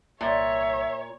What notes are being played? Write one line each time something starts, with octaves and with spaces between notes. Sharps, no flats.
C2 A#2 C#5 E5